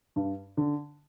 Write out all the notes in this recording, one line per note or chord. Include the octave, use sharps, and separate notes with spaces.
G2
D3